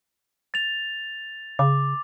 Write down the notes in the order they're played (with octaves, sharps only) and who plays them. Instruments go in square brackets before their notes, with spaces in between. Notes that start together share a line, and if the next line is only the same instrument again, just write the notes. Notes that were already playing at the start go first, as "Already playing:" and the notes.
[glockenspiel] A6 F7
[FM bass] C#3 [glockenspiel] D6